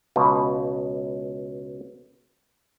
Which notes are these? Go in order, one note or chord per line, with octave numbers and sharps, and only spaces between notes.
C#2 B2